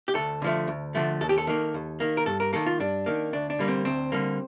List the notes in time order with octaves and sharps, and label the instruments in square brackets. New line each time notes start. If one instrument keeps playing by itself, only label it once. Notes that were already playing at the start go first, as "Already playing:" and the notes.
[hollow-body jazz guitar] G4
D2 A4
D3 F3 A3
D2
D3 F3 A3
D#2 A4
G4
A4
D#3 A#3
D#2
D#3 A#3
A#4
G2 A4
A#4
D#3 A#3 A4
F4
G2 D4
D#3 A#3
D2 D4
D4
D3 G3 A#3
C4
D2 C4
D3 G3 A#3